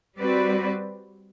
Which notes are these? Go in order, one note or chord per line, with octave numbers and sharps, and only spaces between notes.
G3 C4 F#4 B4 D5